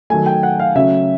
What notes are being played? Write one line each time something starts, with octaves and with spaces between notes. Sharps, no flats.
D#3 F#3 A3 G#5
G5
F#5
F5
C#3 F#3 A3 C#4 E5